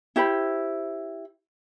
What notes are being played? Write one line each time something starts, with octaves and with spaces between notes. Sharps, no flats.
E4 G4 C5 B5